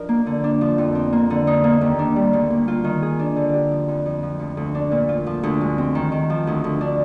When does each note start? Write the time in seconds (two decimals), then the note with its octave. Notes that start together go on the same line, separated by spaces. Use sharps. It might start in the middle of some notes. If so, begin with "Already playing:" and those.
Already playing: F3 D4 D#4 A#4
0.09 A#3
0.26 D3
0.44 D4
0.61 F3
0.78 F2
0.95 C4
1.13 A#3
1.30 D3
1.47 D#4
1.64 A#3
1.81 D#2
1.99 D4
2.16 G3
2.33 D2
2.50 A#3
2.68 F4
2.85 D#3
3.02 G#4
3.19 D4
3.36 D3
3.54 G4
3.71 F3
3.88 F2
4.06 F2
4.23 F3
4.39 D2
4.57 D2
4.75 D4
4.92 A#2
5.09 F4
5.26 F3
5.43 D2
5.61 G#3
5.78 C4
5.95 D#3
6.12 D#3
6.30 F3
6.47 D2
6.64 D2
6.81 D4